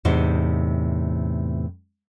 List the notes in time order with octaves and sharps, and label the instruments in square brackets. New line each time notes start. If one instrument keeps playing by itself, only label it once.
[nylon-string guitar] E2 A2 C3 D#4 C5